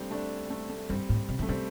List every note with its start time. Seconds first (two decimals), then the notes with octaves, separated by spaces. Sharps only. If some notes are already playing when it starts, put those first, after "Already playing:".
Already playing: G3 A3 C4 D4
0.11 A3 D4
0.50 A3
0.70 A3
0.90 G2 G3 C4
1.09 A2
1.29 C3
1.39 E3 A3
1.48 D3 G3 C4